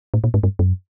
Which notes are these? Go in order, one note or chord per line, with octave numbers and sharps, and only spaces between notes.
A2
A#2
G#2
G2
F#2